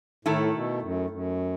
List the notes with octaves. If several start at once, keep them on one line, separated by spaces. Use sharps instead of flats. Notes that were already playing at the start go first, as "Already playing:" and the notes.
A2 D#3 A3 E4 A4
B2
F#2
F#2